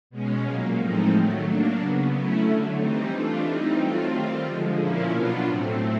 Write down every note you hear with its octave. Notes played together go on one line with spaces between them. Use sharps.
B2 G#3 C#4
A#2 F#3 A#3
A2 F3 G#3 C4 D#4
D#3 F#3 A3
F#3 A#3 D4
C#3 F#3 B3
F#3 A3 C#4 E4
D3 F#3 A3
E3 G3 C4 D#4
E3 A3 D4 F4
E3 G3 C4 D#4
F#3 A3 C4 F4
D#3 G3 C4 F4
D3 F3 G#3
A#2 F3 A#3 C#4 E4
B2 F#3 B3 D4 F4
A2 F#3 A3 C4